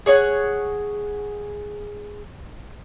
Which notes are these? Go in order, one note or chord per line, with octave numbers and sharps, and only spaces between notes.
G#4 C#5 D5 F#5